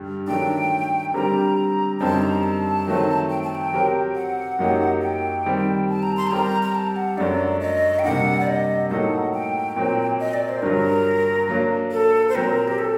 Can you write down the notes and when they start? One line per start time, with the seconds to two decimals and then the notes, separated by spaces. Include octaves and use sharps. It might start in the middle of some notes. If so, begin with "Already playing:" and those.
Already playing: G2 D3 G3
0.27 D#3 F#3 A3 D4 G5
1.14 D3 G3 C4 G4 A#4 A#5
2.00 F#2 D3 G3 C4 D#4 A5
2.22 A#5
2.43 A5
2.87 D#3 F#3 A3 C4
3.30 G5
3.42 A5
3.55 G5
3.73 F#3 C4 G4 A#4
4.15 F#5
4.59 F#2 F#3 A#3 D#4 G4
5.02 G5
5.45 D#3 G3 C4 G4
5.89 A5
6.02 A#5
6.17 C6
6.27 A5
6.31 G3 C4 G4 A#4 A#5
6.63 A#5
6.75 A5
6.96 F#5
7.17 F#2 F#3 A3 D4 D5
7.61 D#5
7.99 G5
8.04 C3 G3 A#3 D4 F#5
8.40 D5
8.47 D#5
8.90 A2 F#3 A#3 D#4 A4 F#5
9.33 G5
9.76 A#2 F#3 C4
10.20 D#5
10.34 D5
10.49 C5
10.62 G2 D3 F#3 A#4
11.49 F#3 A#3 D4
11.91 A4
12.29 C5
12.35 A#2 F#3 C4 A#4
12.68 G4
12.78 A4